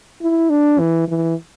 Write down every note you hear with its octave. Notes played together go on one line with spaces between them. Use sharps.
E4
D4
E3
E3